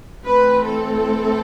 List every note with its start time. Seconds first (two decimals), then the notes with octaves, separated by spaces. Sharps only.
0.24 E3 A3 C4 B4
0.63 A4